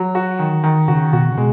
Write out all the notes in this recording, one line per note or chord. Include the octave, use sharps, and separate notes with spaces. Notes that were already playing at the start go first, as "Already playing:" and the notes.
Already playing: F#3
F#4
D#3
D#3
C#3 F#4
B2 F#4
C#3
B2 G#3